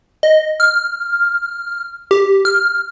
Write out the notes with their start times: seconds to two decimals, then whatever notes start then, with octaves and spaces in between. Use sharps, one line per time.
0.23 D#5
0.60 F6
2.11 G4
2.45 F6